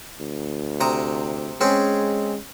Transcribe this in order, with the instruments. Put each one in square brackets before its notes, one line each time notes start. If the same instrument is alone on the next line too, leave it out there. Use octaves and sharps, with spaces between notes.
[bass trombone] D2
[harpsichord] C3 A#5 D#6
[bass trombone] G#3 [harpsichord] C4 C#4 G#4